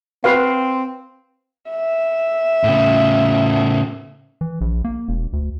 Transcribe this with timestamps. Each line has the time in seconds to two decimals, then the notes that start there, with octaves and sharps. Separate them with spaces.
0.24 C4 F#4 B4 F5
1.71 E5
2.64 A2 C#3
4.41 E3
4.61 A#1
4.84 A#3
5.08 E1
5.33 D2